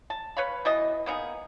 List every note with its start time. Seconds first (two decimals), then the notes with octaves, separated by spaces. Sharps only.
0.10 A5
0.37 B4 C#5 F5 B5
0.65 B2 E3 D#5
1.06 A#3 B3 D#4 G#4